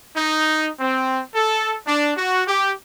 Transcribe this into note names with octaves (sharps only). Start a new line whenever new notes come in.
D#4
C4
A4
D4
F#4
G4